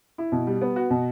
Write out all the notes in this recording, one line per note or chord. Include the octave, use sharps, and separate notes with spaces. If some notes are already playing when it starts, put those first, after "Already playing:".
E4
B2
G3
B3
F#4
B2